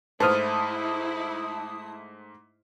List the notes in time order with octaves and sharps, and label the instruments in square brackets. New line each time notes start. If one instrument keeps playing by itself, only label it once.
[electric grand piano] G#2 A3 [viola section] E4 [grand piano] C5 F6 [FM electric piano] A5 D#6